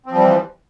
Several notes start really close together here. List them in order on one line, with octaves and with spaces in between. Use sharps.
C4 F3 G3 E3